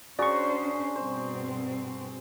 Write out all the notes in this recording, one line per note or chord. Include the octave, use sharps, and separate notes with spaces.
C#4 D4 F#4 G#4 C5 D5 A#5 C#6
G2 B2 C4 C5